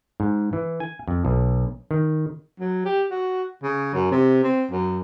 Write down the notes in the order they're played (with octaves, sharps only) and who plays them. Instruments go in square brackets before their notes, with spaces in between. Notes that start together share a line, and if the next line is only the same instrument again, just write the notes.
[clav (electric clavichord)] G#2
E3
G#5
F2
B1
D#3
[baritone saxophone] F#3
G4
F#4
C#3
F#2
C3
C4
F#2